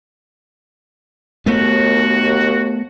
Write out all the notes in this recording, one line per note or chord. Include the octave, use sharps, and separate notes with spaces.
D#2 A3 B3 F#4